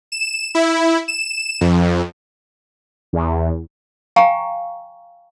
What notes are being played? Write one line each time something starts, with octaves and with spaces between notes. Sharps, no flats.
E7
E4
E7
F2
E2
F5 G5 G#5 A#5 C#6